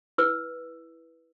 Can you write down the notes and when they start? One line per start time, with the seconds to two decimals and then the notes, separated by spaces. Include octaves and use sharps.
0.18 E4 B4 E6